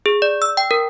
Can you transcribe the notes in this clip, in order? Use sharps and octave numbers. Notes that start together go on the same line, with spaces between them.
G#4
D5
E6
G5
A#4